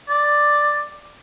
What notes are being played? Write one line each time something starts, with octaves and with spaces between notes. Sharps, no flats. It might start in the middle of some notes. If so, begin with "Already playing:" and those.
D5